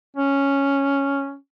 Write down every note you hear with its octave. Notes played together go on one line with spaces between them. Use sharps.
C#4